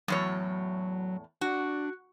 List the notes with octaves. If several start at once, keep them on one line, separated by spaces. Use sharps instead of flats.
E2 A2 F#3 C#5
D4 F#4